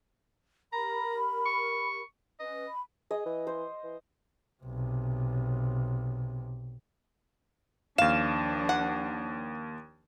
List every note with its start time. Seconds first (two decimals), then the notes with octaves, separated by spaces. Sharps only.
0.73 G4 A#4 A#5 B5
1.46 C#6
2.40 C#4 B4 D#5
2.68 B5
3.11 G#4 D#5
3.26 E3
3.47 C5
3.84 E3
4.63 B1 C3
7.98 D#2 F3 D4 F5 E7
8.69 F#5